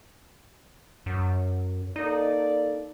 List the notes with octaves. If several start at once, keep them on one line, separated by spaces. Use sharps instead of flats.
F#2
A#3 D#4 A4 D5